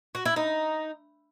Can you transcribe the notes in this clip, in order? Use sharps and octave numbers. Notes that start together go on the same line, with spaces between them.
F#4
E4
D#4